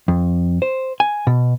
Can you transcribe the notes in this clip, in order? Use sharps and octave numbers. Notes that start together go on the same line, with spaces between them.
F2
C5
G#5
B2